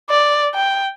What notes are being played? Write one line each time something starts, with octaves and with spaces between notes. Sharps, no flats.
D5
G5